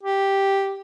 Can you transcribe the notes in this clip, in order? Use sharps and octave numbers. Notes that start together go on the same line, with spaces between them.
G4